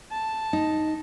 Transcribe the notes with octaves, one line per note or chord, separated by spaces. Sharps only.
A5
D#4